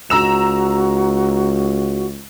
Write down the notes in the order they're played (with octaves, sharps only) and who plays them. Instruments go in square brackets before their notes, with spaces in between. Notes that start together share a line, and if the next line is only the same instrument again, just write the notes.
[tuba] C#2 [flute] F#4 [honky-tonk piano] A#5 E6 E7